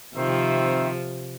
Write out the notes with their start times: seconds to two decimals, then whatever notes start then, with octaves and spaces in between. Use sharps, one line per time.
0.15 C3 D#3 F3 C4 E5